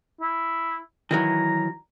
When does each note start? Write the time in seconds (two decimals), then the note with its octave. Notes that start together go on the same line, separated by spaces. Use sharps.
0.21 E4
1.11 D#3 E3 F#3 A#5